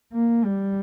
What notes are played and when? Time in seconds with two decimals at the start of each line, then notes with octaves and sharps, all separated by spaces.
0.14 A#3
0.45 G3